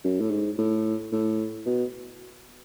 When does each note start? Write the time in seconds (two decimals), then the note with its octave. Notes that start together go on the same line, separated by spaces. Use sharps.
0.04 F#2
0.20 A2
0.31 G#2
0.58 A2
1.12 A2
1.66 B2